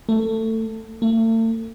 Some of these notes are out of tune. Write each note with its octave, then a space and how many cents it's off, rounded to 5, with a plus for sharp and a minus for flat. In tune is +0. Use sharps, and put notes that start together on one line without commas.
A3 +20
A3 +40